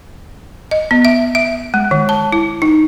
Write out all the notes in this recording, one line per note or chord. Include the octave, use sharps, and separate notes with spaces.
D#5
B3
E5
E5
G#3
D#3
A5
E4
D#4